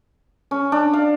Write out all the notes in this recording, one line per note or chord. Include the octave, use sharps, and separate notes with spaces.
C#4
D4
F5